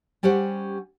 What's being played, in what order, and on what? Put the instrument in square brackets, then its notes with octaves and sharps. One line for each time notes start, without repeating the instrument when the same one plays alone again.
[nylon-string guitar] G3 C#4 G4 C5 F#5